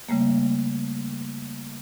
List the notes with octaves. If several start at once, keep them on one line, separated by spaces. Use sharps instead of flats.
C#3 G3 A3 A#3